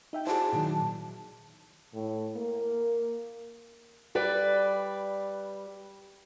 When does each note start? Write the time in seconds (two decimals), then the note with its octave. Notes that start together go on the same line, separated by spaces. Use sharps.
0.13 D#4 E5 G5
0.27 E4 F#4 G#4 C5 A5
0.53 A#2 D#3 F#3
1.94 A2
2.36 A#3
4.15 G3 B4 D5